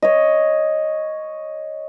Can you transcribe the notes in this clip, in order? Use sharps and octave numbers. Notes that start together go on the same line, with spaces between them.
C#5 D#5